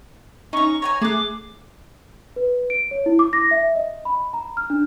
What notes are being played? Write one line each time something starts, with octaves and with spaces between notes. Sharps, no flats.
C#4 D#4 A#5 C#6
C#5 G5 G#5 A#5
A3 G#4 D6 F#6
B4
D7
C#5
E4
D6
A#6
E5
D#5
B5
A#5
F6
D4